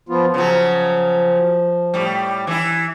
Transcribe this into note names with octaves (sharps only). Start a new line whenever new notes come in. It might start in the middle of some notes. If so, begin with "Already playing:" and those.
F3 B3 F4
C#3 F3 F#3
A2 G3
E3 E4